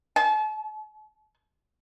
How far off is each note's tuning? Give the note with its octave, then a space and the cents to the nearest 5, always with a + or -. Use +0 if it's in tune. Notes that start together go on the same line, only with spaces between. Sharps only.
A5 -40